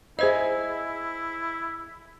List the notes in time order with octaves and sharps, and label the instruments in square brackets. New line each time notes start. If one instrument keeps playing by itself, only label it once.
[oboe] E4 [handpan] G#4 D#5 [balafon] C5 E5